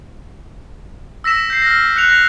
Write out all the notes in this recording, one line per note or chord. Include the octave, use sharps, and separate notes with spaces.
E6 A#6 B6 E7
G6 C7
F6 A#6
F#6 C#7 F7
A#6